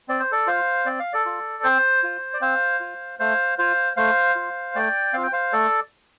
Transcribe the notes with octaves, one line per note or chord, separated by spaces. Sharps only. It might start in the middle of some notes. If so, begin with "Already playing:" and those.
C4 D5
C5
A4 D5
F4 C5 F5
C4 D5
F5
A4 D5
F4
C4 C5
F4
D5
C4 C5 F5
F4
A3 C5 F5
F4 C5 F5
A3 C5 F5
F4
A3 D5 G5
C4 F4 F5
G5
C5 F5
A3 A4 D5